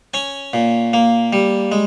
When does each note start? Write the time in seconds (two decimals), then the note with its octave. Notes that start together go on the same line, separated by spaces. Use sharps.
0.14 C#4 G#5
0.53 A#2
0.93 A#3
1.33 G3
1.72 G#3